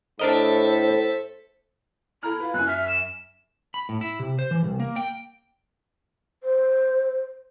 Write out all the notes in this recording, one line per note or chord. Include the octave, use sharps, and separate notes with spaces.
A2 D4 A4 A#4 C5 D#5 E5
E4 A4 A#5 F6
F4 B4
F#2 G#5 F#6
E5 F6
E7
B5
A2
E4
C3
C5
E3
C2
A#3
G5
C5